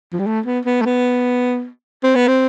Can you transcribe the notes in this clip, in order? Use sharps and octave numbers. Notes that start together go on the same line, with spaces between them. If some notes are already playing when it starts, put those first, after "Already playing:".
F3
G3
A3
B3
B3
A3
B3
C4
B3
C4